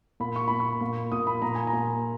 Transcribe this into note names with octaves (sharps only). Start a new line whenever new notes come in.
A#2 B5
C#6
A#2 B5
C#6
A#2
A#2 D#6
B5
A#2 A#5
G#5
A#5
A#2